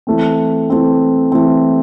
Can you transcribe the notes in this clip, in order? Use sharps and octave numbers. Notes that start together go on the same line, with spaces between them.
E3 A3 C4
E3 A3 C4
E3 A3 C4